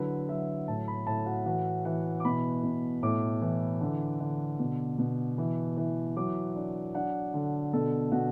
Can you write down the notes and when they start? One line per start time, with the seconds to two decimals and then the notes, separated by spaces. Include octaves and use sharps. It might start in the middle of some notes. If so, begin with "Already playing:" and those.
Already playing: D3 F#3 E4 B4
0.29 F#3 E5
0.68 A2 A5
0.88 B5
1.07 A2 A5
1.26 F#4
1.46 E3 F#4
1.85 E3 F#5
2.20 D6
2.25 B2 B5
2.63 B2
3.03 A2 D6
3.41 E3
3.81 D3
4.20 D3
4.59 B2
4.99 B2
5.38 E3
5.77 E3
6.16 F#3 D6
6.56 D4
6.94 D4 F#5
7.34 D3
7.73 B2 A4
8.12 B2 F#4